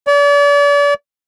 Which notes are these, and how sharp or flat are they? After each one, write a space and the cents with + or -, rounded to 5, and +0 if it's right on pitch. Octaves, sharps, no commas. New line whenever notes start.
D5 -40